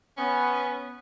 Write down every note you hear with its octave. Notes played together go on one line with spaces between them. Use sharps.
B3 C#4